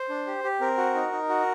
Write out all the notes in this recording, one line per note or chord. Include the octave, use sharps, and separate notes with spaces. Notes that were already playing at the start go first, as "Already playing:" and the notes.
Already playing: C5
D4
G4
G4
C4 A#4
F#4
D#4
D#4
F#4